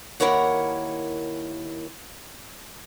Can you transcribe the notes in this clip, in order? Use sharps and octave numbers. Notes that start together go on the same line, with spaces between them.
D#2 C#3 E4 A#4 C#5 F#5